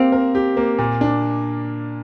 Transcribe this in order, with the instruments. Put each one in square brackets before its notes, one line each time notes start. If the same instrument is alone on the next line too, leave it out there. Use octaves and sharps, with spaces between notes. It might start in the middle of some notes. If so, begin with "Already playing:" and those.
Already playing: [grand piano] A#3 G4 F5 [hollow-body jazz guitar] C4
[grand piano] A#4
G4
A#3
A#2
D4